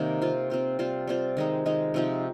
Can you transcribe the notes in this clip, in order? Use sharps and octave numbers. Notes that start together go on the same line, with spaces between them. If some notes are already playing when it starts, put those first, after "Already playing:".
Already playing: C3 D#3 G3 A#3 D#4 A#4
C4 F4 C5
C4 F4 C5
G3 C4 F4 C5
G3 C4 F4 C5
D#3 G#3 D#4
D#3 G#3 D#4
C3 F3 C4 D#4